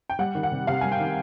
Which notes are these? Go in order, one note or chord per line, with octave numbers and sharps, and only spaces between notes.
G5
G3 F#5
D#3
F#5
C3
C3 F5
G3 G#5
G5
D#3